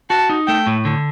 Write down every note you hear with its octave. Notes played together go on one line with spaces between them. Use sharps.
F#4 A5
D#4
A3 G5
A2
D3